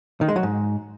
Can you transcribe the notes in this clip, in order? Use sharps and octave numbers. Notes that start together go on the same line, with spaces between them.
D#3
G#3
F#3
G#2